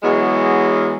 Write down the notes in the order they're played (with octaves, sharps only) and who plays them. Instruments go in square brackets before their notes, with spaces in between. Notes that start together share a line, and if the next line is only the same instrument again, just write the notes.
[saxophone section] E2 F#3 G#3